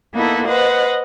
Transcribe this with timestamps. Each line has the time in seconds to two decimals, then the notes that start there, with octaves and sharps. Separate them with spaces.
0.15 A#3 B3 D#4 E4 A4
0.45 B4 C5 D#5 F#5